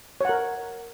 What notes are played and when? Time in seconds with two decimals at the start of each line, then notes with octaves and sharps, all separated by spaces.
0.21 C#5
0.25 F#5
0.29 A#4